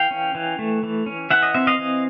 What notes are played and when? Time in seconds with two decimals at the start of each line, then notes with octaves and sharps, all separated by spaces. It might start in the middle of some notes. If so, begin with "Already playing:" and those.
Already playing: E3 F5 G5
0.11 C#4
0.35 E3
0.59 A3
0.83 E3
1.06 C#4
1.31 E3 E5 F#5
1.43 D#5
1.54 C4 E5
1.67 D#5 F5
1.79 E3